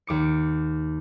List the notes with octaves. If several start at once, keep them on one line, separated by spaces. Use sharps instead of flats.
D#2 D6 C#7